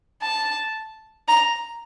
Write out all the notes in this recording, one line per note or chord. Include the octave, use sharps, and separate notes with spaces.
A5
A#5